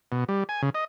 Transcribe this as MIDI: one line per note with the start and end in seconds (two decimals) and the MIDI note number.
0.12 0.24 47
0.29 0.44 55
0.49 0.62 80
0.62 0.70 49
0.75 0.85 75